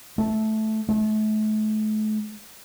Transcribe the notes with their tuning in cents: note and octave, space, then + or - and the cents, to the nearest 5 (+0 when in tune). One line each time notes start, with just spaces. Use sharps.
A3 -10
A3 -40